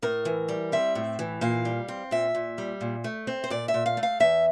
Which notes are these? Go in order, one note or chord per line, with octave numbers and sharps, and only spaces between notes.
A2 A#4
E3
G3
C4 E5
A2
E3
A#2 F5
G3
C4
A#2 E5
A#2
G3
A#2
A3
C4
C5
A#2 D5
E5
A#2
F5
A3
F5
E2 E5